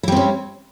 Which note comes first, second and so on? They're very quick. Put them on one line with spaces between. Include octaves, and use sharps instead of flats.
E4 G3 C4 C#4